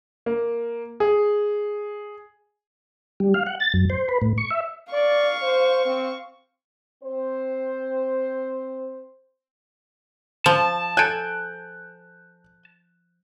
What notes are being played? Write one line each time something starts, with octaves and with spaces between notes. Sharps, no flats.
A#3
G#4
G3
F5
F#5
A6
F#2
C5
B4
A2
C#6
E5
D5 F5 C#6
C5
C4
C4 C5
F3 A5
A4 G#5 F#6 G6 D7